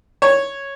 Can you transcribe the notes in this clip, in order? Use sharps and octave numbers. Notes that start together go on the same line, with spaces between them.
C#5